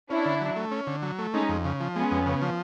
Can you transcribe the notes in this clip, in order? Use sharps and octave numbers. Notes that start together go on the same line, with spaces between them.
C#4 D4 E4
D3
F#3
A3
C#4
D3
F#3
A3
G#3 C#4 D#4
F2
C#3
F3
G#3 B3 C#4
F2
C#3
F3